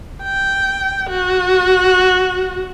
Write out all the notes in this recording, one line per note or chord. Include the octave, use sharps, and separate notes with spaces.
G5
F#4